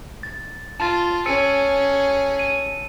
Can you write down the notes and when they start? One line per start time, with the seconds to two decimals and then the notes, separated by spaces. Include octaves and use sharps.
0.23 A6
0.80 F4 A5 A6
1.26 C#4 G#4 E6 C#7 D#7
2.39 D#7